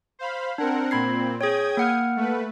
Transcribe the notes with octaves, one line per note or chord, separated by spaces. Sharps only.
C5 F5 B5
C4 D4 A#4 F#5
A#2 C4 B5 G#6 C7
G#4 C#5 G5 D#6 G#6
A#3 F#5 F6
A3 B4